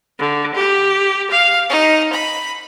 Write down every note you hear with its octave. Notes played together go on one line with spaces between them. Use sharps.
D3
G4
F5
D#4
B5